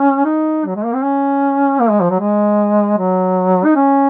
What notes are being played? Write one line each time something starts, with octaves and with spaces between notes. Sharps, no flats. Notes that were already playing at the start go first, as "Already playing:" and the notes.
Already playing: C#4
D#4
F#3
G#3
A#3
C4
C#4
A#3
G#3
F3
F#3
G#3
F#3
D#4
C#4